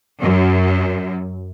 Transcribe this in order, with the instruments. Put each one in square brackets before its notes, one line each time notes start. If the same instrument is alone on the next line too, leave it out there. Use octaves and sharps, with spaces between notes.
[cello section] F#2